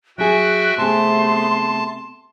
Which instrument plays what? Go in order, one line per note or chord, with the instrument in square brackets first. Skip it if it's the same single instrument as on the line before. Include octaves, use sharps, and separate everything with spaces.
[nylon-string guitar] F#3 G#4 [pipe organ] F#4 E5 G5 [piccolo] F#6
[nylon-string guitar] C3 G#4 [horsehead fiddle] A3 B3 [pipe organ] A5 [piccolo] C6